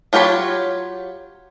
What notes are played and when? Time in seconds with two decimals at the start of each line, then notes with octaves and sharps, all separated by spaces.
0.13 F#3 F4 G4 C#5 B5